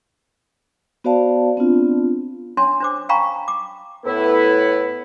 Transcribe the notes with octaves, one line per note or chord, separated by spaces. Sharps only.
B3 F#4 C5 D5 F5 A5
B3 C4 D4 F4
C#4 D4 C#5 G#5 C6
D4 C5 D6
F5 G5 G#5 A#5 B5 C#6
D6
A2 B3 E4 B4